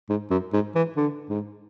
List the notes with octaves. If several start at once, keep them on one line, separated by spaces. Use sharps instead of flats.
G#2
F#2
G#2
E3
D3
G#2